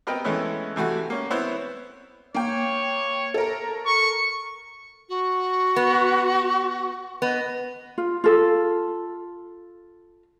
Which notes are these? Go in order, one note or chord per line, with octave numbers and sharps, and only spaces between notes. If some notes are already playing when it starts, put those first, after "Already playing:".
B3 C4 A#4 B4 D#5 G5
E3 G#3 A3 B3 C#4 E4
C3 E3 A3 F#4
A#3 C#4
B3 C4 E4 C5 C#5
A#3 C#5 G5
A4 A#4
C#6
F#4
B3
B3 D#5
F4
F4 A4